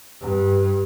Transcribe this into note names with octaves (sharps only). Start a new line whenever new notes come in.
G2